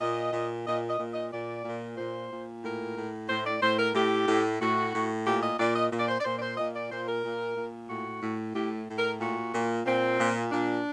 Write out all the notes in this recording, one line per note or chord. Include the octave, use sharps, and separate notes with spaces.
A#2 D#5
A#2
A#2 D#5
D#5
A#2
D#5
A#2 D5
A#2
A#2 C5
A#2
A2 A#4
A2
A2 C5
D5
A2 C5
A#4
A2 G4
A2
A2 F#4
A2
A#2 G4
D#5
A#2 D5
D#5
A#2
D5
C5
D5
A#2 C5
D5
C5
A#2 D#5
D5
A#2 C5
A#4
A#2
A#2
A2 F#4
A2
A2 G4
A2
A#4
A#2 F#4
A#2
A#2 C4
A#2
A#2 D4